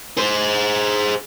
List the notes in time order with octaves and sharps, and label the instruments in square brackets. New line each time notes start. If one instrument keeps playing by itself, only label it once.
[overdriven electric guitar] G#4 C5